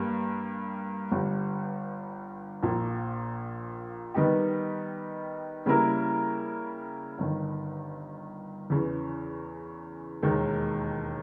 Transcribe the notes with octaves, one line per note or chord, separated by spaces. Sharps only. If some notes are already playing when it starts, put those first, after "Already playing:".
Already playing: G2 G3 A#3
G1 G2 G3
A#1 A#2 A#3
D#3 G3 B3 D#4 G4
C#3 G3 A#3 E4 A#4
G1 G2 D#3
E2 C#3 E3
E1 D#2 D#3 G#3